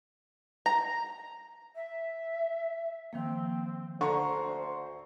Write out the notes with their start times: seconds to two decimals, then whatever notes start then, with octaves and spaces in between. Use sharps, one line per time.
0.66 A#5
1.75 E5
3.13 D#3 F3 A#3 C4
4.01 D2 D3 C5 A#5 C6 C#6